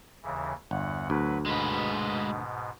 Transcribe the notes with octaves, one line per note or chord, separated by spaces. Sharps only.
D#2 C#3 E3
G1 E2 F#5
D2 F#3 B4
G#2 B2 G#3 B4